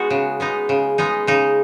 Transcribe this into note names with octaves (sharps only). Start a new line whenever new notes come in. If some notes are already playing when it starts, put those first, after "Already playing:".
Already playing: G#3 B3 D#4 F#4
C#3
G#3 B3 D#4
C#3
G#3 B3 D#4
C#3 D#4